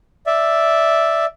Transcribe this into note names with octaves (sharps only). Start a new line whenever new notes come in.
D5 E5